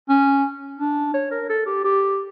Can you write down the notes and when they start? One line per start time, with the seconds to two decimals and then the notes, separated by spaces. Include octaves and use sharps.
0.09 C#4
0.79 D4
1.14 C#5
1.31 A#4
1.49 A4
1.66 G4
1.84 G4